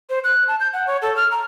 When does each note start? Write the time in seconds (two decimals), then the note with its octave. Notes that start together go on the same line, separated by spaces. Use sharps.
0.10 C5
0.24 F#6
0.48 A5
0.60 G6
0.73 F#5
0.87 C#5
1.02 A4
1.17 F6
1.32 A#5